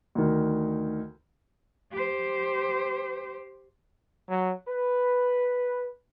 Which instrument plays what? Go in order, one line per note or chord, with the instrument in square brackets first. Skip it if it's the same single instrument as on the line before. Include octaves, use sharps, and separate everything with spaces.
[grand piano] D2 D#3
[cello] G4 C5
[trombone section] F#3
B4